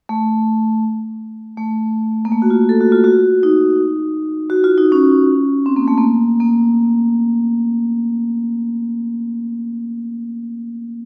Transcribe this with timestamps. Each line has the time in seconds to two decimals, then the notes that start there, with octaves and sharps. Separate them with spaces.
0.09 A3
1.58 A3
2.25 A#3
2.32 A3
2.42 F#4
2.50 F4
2.69 A4
2.81 F#4
2.92 F4
3.04 F#4
3.43 D#4
4.50 F#4
4.64 F4
4.78 D#4
4.92 C#4
5.66 C4
5.77 A#3
5.87 A3
5.98 A#3
6.40 A#3